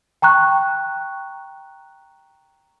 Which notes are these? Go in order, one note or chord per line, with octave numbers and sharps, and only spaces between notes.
G5 A#5 C#6 F#6